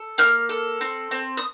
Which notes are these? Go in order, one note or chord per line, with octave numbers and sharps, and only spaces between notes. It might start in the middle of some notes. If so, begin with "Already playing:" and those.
Already playing: A4
A#3 F6
A4
C4
C4
D#6